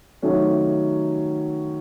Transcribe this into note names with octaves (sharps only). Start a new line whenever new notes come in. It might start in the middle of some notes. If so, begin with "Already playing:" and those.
C3 D#3 F#3 A3 C#4